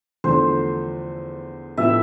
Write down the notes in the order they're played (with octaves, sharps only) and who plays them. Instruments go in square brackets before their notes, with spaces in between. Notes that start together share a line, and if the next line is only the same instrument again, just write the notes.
[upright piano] E2 D3 F3 A3 [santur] C5
[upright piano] A2 F3 B3 E4 A4 [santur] E5